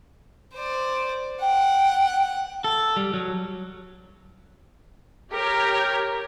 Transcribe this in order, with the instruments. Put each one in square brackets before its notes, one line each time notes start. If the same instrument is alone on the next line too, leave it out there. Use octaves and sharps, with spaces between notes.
[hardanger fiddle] C5 D5
[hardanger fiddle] F#5 [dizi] G5
[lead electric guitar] A4
G3
F#3
[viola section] G4 A#4 C#5 G5